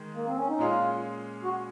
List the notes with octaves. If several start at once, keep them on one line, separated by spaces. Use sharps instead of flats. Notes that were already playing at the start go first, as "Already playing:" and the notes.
Already playing: D#3 G#3
A#3
C4
C#4
D#4
A#2 G#3 C#4 F4 G#4
F#4